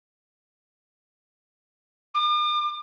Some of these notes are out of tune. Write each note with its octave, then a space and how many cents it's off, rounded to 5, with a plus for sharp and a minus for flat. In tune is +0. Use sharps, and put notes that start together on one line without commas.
D6 +45